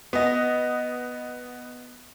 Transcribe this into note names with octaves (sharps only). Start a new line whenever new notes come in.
B3 D#5